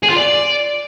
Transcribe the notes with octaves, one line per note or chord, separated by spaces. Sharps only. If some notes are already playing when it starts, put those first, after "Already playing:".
G#4
F4
D5